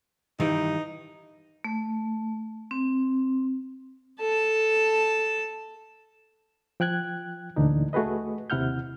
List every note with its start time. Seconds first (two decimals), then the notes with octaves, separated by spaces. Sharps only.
0.40 G2 D#3 E3 D#4
1.64 A3
2.71 C4
4.21 A4 A5
6.80 F3 G5 F#6 G#6
7.56 D2 A#2 D3 E3 D4 D#4
7.93 A3 F#4 G#4 B4 D#5
8.50 D#2 C3 E4 F#5 F6 G6